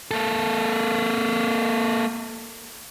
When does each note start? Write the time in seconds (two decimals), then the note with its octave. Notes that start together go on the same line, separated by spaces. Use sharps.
0.11 A#3 A4